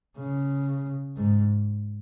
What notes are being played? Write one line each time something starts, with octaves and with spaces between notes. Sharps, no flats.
C#3
G#2